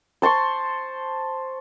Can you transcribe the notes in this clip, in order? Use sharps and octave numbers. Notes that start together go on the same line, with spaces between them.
C5 A5 C6 C#6